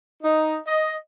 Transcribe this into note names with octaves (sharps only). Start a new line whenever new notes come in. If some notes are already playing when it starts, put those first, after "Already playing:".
D#4
D#5